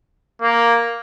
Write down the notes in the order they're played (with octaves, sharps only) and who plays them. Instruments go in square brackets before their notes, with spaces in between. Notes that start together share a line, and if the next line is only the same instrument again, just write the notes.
[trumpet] A#3